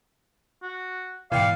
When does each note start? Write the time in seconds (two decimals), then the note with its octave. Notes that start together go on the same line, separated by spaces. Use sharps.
0.63 F#4
1.32 G#2 B2 E3 D5 F5 G5 C#7